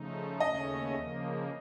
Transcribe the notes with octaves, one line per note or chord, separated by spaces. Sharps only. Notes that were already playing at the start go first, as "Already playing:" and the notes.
Already playing: C#3 F3 A3 D#4
D#2 C#3 A3 C#4 D#5
C#3 F3 A#3